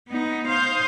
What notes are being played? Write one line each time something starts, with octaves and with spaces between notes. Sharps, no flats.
B3 D#4
C5 F5 C6 D#6 G6